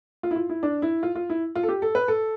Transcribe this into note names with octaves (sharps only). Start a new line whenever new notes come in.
F4
E4
F4
E4
D4
E4
F4
F4
E4
F4
A4
G4
A4
B4
A4